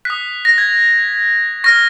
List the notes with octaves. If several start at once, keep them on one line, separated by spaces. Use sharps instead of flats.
D#6 F#6 B6
A#6
G#6
C#6 F6 A#6